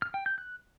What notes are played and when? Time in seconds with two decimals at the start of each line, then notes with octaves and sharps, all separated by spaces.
0.02 F6
0.14 G5
0.26 G6
0.38 F#6